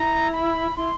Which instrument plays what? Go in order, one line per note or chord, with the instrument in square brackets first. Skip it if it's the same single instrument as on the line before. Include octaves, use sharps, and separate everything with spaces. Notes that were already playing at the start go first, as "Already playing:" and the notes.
Already playing: [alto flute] E4 [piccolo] A#5
[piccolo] B5
[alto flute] E4 [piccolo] C6